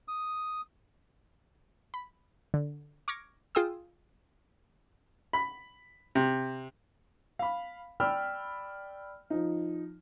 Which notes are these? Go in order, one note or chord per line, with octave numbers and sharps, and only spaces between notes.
D#6
B5
D3
C#6 D6 F6 G#6 A#6
F4 G#4 G5 C6 D#6 E6
B5
C3
F5 B5
D5 G5 B5 E6 F6
F3 D#4